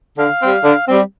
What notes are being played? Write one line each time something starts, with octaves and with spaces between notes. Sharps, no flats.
D3 F5
G3 C4
D3
G3 C4